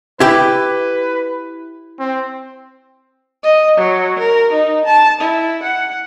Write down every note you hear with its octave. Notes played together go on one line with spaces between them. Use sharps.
E4 G4 B4
C4
D#5
F#3
A#4
D#4
A5
E4
F#5